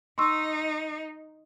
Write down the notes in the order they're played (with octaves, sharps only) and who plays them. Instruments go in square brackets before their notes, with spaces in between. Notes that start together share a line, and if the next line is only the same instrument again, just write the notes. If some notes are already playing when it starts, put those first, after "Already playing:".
[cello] D#4 [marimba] C6 C#6 E6